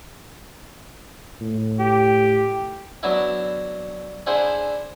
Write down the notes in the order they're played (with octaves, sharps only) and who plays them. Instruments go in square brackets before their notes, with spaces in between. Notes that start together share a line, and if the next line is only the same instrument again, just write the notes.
[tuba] A2
[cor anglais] G4
[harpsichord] F#3 B3 D4 E4
D4 E4 G#4 C5 F#5